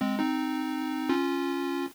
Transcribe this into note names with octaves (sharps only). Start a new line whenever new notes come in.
G#3 C4
C4 D#4
C#4 F4